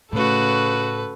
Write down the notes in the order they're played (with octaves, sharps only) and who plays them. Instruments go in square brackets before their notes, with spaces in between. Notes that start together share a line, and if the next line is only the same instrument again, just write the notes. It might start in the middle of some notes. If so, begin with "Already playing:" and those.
[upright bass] A2 [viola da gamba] C#3 F#4 [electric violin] A4 B4